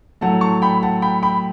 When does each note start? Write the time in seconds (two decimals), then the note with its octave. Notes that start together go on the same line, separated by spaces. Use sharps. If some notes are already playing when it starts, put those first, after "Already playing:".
0.21 A2 F#3 A3 F#5 A5
0.41 A5 C#6
0.62 G5 B5
0.82 F#5 A5
1.02 G5 B5
1.23 G5 B5